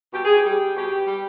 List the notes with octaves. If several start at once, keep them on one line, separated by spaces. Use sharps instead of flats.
B2 G4
G#4
G4
G3
B2 G4
G3